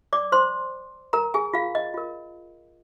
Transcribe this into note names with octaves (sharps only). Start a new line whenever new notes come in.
D5 D6
C5 C6
A#4 A#5
G#4 G#5
F4 F5
D#5
F4 A#4